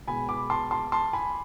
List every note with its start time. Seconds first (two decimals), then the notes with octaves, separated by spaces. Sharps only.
0.08 B2 G#3 G#5 B5
0.29 B5 D6
0.50 A5 C6
0.71 A5 C6
0.92 A5 C6
1.13 G#5 B5